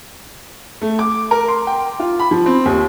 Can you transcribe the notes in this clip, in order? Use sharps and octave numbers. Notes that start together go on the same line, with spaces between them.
A3
D6
A#4
C6
G5
F4
B5
F3
C4
D#2